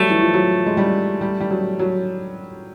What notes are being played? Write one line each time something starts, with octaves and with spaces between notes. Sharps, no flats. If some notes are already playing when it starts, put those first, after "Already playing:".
Already playing: F#3 G3 A3
E3
F3
F#3
G#3
G3
G3
G3
F#3
F#3